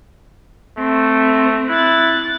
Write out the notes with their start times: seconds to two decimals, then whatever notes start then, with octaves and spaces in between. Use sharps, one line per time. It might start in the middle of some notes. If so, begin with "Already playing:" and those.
0.78 A3 C4
1.69 E4 F#6 A6